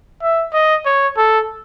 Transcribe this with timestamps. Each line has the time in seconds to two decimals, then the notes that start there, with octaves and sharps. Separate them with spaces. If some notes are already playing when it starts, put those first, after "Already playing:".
0.22 E5
0.53 D#5
0.86 C#5
1.17 A4